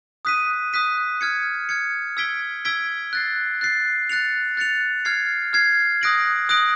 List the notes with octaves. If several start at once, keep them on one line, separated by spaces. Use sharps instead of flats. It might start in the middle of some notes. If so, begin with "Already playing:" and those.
D#6 F#6 B6 D#7
D#6 F#6 B6 D#7
F6 G#6 C#7
F6 G#6 C#7
E6 G#6 B6 D7 G7
E6 G#6 B6 D7 G7
F#6 A6 C7
F#6 A6 C7
F#6 A6 C#7 F7
F#6 A6 C#7 F7
F6 G#6 C7
F6 G#6 C7
D#6 F#6 A#6 D7 F#7
D#6 F#6 A#6 D7 F#7